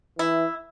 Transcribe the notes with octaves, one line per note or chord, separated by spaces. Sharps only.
E3 E4